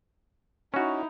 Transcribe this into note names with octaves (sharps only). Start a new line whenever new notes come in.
C#4 D#4 E4 F#4